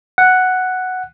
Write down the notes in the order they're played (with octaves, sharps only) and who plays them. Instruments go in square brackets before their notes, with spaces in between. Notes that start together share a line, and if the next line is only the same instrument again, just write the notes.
[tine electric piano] F#5